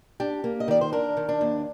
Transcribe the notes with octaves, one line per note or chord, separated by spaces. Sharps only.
D4 G4
A#3
D#5
D#3 D5
C5
D4 A#4
D#3
D4
D#2